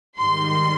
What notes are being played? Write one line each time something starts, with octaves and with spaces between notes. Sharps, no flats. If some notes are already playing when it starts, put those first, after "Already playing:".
G#2 D#3 G3 C6